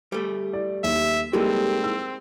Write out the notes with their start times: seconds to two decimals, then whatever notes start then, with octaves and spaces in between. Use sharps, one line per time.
0.12 G3 A3
0.53 D5
0.84 D#2 E5
1.33 G3 G#3 A#3 C4 D#4 A4
1.84 E6